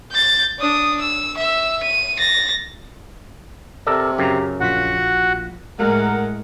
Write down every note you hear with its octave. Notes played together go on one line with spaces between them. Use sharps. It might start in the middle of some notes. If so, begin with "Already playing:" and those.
G6 A6
D4 D#6
E6
E5 E6
D#7
A6 A#6
C3 A4 A#4 D5
F#2 C#3 G4 A#5
A#1 F4 F#4 F#5 B6
A2 G#3 A#4 F#5